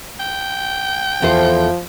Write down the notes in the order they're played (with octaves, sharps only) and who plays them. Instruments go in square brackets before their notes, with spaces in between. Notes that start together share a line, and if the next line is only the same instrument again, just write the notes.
[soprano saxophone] G5
[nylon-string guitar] E2 A4 C5 [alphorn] F3